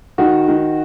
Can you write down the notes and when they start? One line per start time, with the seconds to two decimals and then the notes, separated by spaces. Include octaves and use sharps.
0.18 D#3 F#4
0.48 D#3